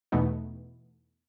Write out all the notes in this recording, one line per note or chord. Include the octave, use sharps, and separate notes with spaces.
E2 B2 E3 A3 B3 D#4